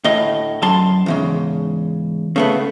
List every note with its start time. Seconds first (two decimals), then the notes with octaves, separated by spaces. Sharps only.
0.04 D2 A2 D#5
0.62 F#2 A5 C6
1.06 E2 G#2 C#3
2.36 C#3 A3 B3